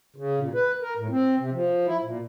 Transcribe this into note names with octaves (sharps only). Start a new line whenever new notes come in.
C#3
A#2
B4
A#4
A2
C4
C3
F3
E4
A#2